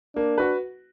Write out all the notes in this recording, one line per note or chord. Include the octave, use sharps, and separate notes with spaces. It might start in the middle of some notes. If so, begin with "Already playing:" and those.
A#3 D4
F#4 B4